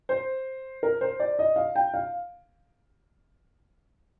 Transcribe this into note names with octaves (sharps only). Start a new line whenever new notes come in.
C5
A#4
C5
D5
D#5
F5
G5
F5